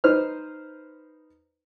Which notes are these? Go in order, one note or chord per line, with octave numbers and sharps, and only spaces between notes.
D#4 B4 C5 F6